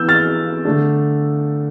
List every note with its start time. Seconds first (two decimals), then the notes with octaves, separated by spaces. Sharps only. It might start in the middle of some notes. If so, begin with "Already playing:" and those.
Already playing: E3 B3 E6 G6
0.08 F6 A6
0.65 D3 A3 D4